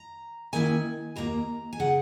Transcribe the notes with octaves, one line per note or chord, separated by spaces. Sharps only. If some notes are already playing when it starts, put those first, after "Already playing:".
Already playing: A#5
D#3 A#3 C#4 E4 G#5
D#2 D#3 A#3 A#5
G#5
C#3 F#5